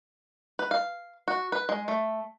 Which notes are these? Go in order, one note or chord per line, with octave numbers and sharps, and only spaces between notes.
B4
F5
F#4
B4
G#3
A3